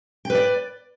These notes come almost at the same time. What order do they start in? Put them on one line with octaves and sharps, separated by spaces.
G5 B4 D5